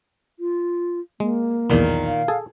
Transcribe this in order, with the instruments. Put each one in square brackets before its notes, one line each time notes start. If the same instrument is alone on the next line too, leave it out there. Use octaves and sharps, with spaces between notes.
[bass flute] F4
[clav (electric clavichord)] G#3 [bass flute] A#3
[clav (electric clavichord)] B1 E2 [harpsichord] A#2 D#3
[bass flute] F5
[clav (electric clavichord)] G#4 A4